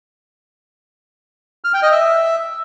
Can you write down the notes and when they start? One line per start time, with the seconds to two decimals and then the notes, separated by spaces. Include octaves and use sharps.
1.64 F6
1.74 G5
1.83 D#5
1.92 E5